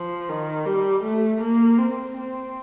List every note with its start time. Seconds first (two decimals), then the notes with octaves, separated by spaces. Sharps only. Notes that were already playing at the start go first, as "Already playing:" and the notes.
Already playing: F3
0.29 D#3
0.66 G3
1.03 A3
1.41 A#3
1.78 C4
2.17 C4